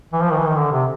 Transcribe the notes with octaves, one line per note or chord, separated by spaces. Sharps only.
E3
F3
D#3
E3
D#3
D3
C3